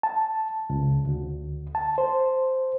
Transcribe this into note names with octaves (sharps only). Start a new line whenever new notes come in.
A5
C#2
D2
A5
C5